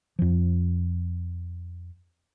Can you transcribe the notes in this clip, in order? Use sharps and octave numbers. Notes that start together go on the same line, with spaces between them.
F2 F3